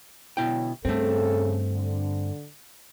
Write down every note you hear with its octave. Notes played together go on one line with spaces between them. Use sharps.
B2 D3 F#3 E4 G5
G2 C#3 A3 C4 A4
D3